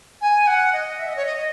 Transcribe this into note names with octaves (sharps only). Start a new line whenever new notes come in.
G#5
F#5
D#5
E5
D#5
C#5
D#5
D#5